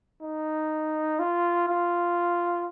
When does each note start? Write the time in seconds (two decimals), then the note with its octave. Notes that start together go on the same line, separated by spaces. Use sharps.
0.22 D#4
1.19 F4
1.68 F4